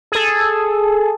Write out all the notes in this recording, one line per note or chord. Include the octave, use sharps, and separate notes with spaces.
G#4 A4